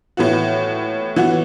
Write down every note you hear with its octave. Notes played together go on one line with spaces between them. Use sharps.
A2 E3 B3 F#4
E3 B3 F#4